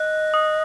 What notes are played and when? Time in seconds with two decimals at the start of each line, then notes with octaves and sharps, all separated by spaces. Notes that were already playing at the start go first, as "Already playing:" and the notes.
Already playing: D#5 F#6
0.34 D#6